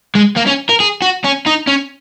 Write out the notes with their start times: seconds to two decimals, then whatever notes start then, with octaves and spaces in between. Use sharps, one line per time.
0.15 G#3
0.37 A#3
0.47 C#4
0.69 A#4
0.80 G#4
1.02 F#4
1.24 C#4
1.46 D#4
1.68 C#4